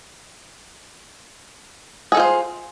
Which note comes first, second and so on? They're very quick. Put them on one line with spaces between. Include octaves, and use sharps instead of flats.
G#4 A4 F4 C5